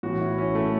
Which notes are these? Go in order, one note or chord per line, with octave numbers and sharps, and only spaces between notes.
A2 E3 F#4
E4
C#4
A3